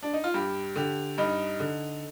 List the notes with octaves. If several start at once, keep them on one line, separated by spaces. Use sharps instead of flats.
D4
D#4
F4
G2 G4
D3 G4
G2 D#4
D3